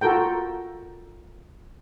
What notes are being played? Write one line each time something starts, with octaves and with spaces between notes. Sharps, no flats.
F4 F#4 A4 A#4 G5